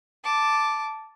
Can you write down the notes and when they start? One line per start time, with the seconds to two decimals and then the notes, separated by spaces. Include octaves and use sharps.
0.24 A5 D6